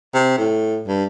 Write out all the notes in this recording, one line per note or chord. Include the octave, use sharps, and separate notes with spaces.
C3
A2
G2